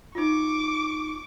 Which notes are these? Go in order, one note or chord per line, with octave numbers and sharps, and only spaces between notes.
D#4 F4 C#6 D6